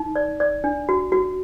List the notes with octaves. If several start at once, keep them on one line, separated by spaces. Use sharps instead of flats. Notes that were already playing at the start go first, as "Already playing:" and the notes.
Already playing: D#4
D5
D5
D4
F#4
F#4